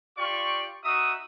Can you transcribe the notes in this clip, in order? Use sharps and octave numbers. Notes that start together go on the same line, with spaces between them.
F4 G4 D5 G5 C#6
D#4 F#4 E5 D#6